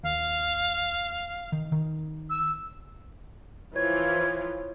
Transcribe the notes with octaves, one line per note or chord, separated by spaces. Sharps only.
D#2 F5
D#3
D#3
E6
E3 F3 F4 C#5 G#6